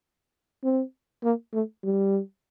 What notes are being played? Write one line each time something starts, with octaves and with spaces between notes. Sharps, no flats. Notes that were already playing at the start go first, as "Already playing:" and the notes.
C4
A#3
A3
G3